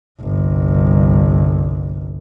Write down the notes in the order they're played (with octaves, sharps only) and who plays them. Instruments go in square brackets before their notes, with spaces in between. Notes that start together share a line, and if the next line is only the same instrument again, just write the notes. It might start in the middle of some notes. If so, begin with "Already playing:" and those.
[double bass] G1 C2